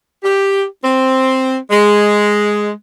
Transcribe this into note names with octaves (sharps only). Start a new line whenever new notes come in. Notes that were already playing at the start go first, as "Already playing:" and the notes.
G4
C4
G#3